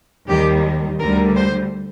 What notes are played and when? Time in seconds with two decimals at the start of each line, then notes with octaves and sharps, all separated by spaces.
0.28 D#2 D#3 G3 G4
0.99 D2 D3 G3 A#4
1.35 C5